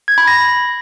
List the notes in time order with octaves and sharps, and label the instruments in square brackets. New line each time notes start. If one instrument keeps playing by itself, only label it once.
[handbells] G#6
B5
A#6